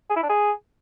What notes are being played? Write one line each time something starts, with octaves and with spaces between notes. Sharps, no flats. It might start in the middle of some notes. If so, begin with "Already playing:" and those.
G#4
E4
D4
G#4